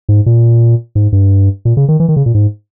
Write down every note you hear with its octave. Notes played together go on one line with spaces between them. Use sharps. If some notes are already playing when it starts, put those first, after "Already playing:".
G#2
A#2
G#2
G2
A#2
C#3
D#3
E3
D#3
C#3
A#2
G#2